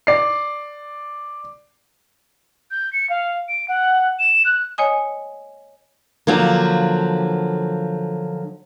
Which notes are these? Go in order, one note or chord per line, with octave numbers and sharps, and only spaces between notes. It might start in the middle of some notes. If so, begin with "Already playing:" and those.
D5 C7
G6
C#7
F5
D7
F#5
E7
F#6
C#5 D#5 G#5 D#6
D3 F3 F#3 A#3